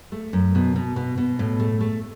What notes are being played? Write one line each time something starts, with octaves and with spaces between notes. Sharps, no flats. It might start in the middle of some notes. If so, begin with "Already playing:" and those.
A3
F#2
B2
B2
B2
B2
A2
A3
A3